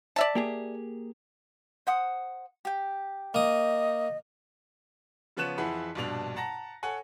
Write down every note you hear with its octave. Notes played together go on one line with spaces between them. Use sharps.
D5 E5 A5
A#3 G4 G#4
C5 F#5 D#6
G4 G5
A#3 D#5 D#6
C#3 F3 B3 C#5 F#6 E7
F2 E3 E4 G#4 F#5 B5
A#1 G2 B2 D4 F7
F#5 A5 A#5 A#6
A4 C#5 F#5 G#5